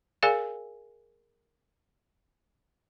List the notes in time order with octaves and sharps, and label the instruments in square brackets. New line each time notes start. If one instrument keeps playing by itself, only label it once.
[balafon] G#4 A#4 D5 F5 G#5